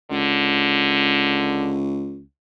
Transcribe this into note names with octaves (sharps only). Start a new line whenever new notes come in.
C#2 D3